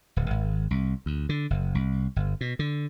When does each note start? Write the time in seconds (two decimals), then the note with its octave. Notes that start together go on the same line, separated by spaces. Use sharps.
0.16 D1
0.31 G#1
0.71 C2
1.06 D2
1.29 D3
1.50 F#1
1.75 C2
2.16 G1
2.41 B2
2.59 D3